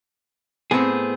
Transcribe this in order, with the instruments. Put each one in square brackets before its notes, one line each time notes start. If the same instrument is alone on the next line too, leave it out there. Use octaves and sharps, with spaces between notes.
[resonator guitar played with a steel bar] A2 C4 [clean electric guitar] B3 G#4